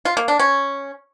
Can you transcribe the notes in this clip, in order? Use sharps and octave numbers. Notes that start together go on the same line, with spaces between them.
F4
A#3
D4
C#4